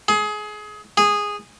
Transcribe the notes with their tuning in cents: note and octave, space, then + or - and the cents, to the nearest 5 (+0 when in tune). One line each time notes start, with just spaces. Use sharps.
G#4 +25
G#4 -10